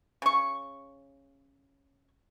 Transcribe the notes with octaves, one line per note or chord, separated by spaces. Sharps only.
C#3 C#6